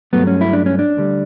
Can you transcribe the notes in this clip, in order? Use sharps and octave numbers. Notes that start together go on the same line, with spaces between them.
G2 F#3 A3 B3
C#4
E4
D4
C#4
D4
D2 D3 G3